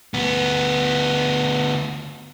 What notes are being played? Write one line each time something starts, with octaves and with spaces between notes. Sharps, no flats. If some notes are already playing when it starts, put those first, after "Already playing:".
D2 B3